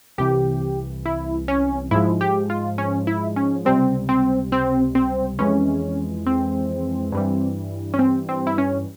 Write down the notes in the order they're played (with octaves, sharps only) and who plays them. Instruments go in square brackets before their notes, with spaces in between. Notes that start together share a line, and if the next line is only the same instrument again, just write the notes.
[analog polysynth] C2 C3 E3 G4
E4
C#4
G#2 F3 G#3 E4
G4
F4
C#4
E4
C#4
C#2 C3 G3 C4
C4
C4
C4
F2 E3 G#3 C#4
C4
G2 E3 G3
C#4
C4
C4
E4
C#4